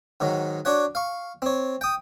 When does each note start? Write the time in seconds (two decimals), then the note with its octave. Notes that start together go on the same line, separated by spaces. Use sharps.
0.20 G#2 D#3 F#3
0.65 D4 F#4 C#5 F#5
0.95 F5 C#6
1.42 C4 C#5
1.81 G5 D#6